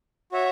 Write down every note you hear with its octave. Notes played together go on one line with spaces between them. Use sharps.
F#4 C#5 E5